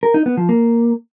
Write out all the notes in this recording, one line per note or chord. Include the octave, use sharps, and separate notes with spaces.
A#4
D#4
B3
F3
A#3